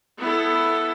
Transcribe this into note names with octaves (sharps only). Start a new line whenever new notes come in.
B3 E4 A4